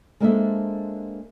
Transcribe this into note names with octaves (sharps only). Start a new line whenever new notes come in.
G#3 A#3 D4 A4 C5 E5